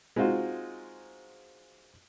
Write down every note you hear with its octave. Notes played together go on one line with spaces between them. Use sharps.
G#3 C4 D#4 F4 F#4